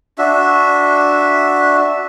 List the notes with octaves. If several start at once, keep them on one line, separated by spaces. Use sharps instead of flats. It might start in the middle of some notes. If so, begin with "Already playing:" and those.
D4 F#4 E5